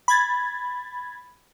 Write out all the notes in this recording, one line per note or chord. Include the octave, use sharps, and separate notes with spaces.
B5 G#6 A6